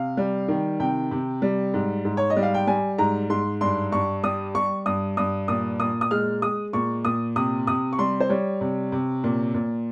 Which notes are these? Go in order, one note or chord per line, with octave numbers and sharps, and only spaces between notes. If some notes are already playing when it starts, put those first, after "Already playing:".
Already playing: C3 F5
G3
D#3
C3 G5
C3
G3
G#2
G#2
C#5
D#5
G3
F5
G5
G3 G#5
G#2 A#5
G#2 C6
G2 C6
G2 C#6
G3 D#6
G3 C#6
G2 D#6
G2 D#6
A#2 D#6
A#2 D#6
D#6
G#3 F6
G#3 D#6
A#2 C#6
A#2 D#6
C3 D#6
C3 D#6
C#6
G3 C6
C5
G3 C#5
C3
C3
A#2
A#2